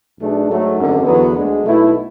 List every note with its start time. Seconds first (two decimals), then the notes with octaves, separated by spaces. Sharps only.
0.19 B1 B2 A3 D4 G#4
0.47 G#2 F#3 A3
0.77 G#1 F#2 D3
1.05 E2 D3 F#3 B3
1.35 D2 D3 G#3
1.64 B1 B2 A3 E4